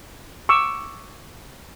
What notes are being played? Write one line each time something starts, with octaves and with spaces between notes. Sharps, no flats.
C#6 D6 E6